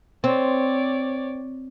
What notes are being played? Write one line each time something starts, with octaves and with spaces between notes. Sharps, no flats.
C4 C#5 D5